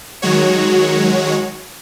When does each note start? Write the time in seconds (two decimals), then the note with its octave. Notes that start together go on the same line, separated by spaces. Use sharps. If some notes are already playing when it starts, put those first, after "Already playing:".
0.22 D#3 F#3 G#3 F#4 C#5